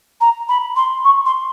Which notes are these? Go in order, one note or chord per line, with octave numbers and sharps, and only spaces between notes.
A#5
B5
C6
C#6
C6